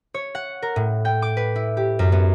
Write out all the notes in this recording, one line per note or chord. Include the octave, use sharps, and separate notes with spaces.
C#5
F#5
A#4
A2
G5
D6
B4
E4
G4
F#2
B3